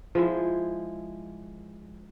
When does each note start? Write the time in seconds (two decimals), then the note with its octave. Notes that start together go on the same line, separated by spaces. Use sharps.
0.15 F3 G#3 E4